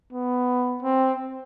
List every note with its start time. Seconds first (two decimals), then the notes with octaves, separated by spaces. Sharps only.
0.13 B3
0.83 C4